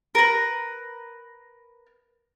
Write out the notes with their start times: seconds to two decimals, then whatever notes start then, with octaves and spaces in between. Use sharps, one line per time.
0.15 A#4 B4